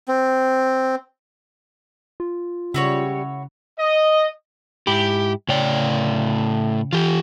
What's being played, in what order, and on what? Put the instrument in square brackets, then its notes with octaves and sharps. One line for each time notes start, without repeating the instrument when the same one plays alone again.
[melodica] C4
[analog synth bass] F4
[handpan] C#3 [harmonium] G3 [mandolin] E4 F#4 C#5
[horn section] D#5
[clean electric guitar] G#2 E4 B5 [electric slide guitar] G4
[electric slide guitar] A2 D5 [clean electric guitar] C#3 C#5 G5
[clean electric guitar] E3 [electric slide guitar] F4 G4